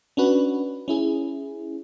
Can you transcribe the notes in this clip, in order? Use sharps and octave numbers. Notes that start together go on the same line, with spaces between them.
C#4 D4 F#4 B4
C#4 E4 G#4